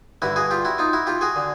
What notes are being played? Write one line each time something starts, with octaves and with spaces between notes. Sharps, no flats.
G2 D3 E4 F#4
F#4 G#4
F4 G4
E4 F#4
D#4 F4
E4 F#4
F4 G4
F#4 G#4
D3